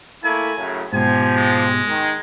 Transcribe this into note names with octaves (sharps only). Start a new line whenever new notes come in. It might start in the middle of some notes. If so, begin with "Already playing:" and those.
A3 A#3 E4 G#5
F#2 A2 C#3
G#2 B2 F3 G4 G#5
G#3
D#3